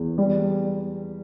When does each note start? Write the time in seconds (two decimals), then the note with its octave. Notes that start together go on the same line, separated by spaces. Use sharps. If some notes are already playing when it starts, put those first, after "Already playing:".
Already playing: E2
0.18 G3